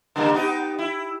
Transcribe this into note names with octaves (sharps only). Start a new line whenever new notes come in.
C#3 G3 A#3
B3 D#4 G4
E4